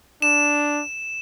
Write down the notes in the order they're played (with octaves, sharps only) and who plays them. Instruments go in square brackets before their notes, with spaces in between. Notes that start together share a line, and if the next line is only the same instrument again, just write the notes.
[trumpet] D4 [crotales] E7